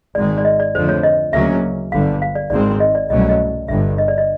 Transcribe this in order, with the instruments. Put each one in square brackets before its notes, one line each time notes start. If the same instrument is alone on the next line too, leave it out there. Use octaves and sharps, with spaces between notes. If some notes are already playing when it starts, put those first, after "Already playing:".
[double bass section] G#1 G#2 D#3 G#3 [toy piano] D5
[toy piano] D5
D#5
D5
[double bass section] F2 D3 F3 A3 [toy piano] C5
[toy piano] C#5
D#5
[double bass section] D2 C#3 F#3 A#3 C#4 [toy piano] E5
[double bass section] G1 G2 D3 G3 [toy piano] F5
[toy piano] F5
D5
[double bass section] G#1 G#2 D#3 G#3 C4 [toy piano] D5
[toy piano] D#5
D5
[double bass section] C2 B2 F#3 A3 C#4 [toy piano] D#5
[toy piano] D5
D#5
[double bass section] G1 G2 D3 [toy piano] E5
[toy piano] D#5
D5
D#5